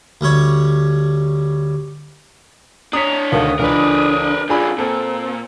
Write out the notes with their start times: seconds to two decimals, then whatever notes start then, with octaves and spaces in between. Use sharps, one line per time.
0.21 D2 G3 C#5
2.93 D4 C#5 A#5 D#6 B6
3.32 D2 D#3 F5 D#6
3.59 C#2 E3 D4 A#4 B4
4.49 C#3 G3 D4 F4 G#4 B5 E6
4.78 A#2 C4 A4